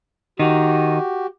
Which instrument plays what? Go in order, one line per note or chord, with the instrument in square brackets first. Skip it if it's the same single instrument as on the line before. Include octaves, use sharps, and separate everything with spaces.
[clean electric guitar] D#3 D#4 [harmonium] F#4 G4